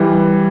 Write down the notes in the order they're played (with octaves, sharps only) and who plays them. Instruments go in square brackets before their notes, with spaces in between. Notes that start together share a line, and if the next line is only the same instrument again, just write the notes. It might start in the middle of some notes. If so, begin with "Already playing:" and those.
Already playing: [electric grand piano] E3 G3